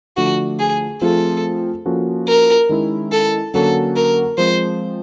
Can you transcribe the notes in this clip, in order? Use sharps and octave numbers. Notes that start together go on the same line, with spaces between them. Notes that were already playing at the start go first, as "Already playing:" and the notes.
D3 F3 A3 D4 F#4
G#4
F3 A3 C4 F4 G#4 A4
F3 A#3 C#4 F#4 A4
A#4
D#3 G#3 C#4 E4
A4
D3 F#3 A#3 C#4 F#4 A4
A#4
F3 G#3 C4 C5